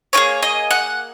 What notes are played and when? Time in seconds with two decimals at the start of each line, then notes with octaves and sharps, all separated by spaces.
0.13 A#3 F4 G#4 C#5
0.43 D#5
0.71 F#5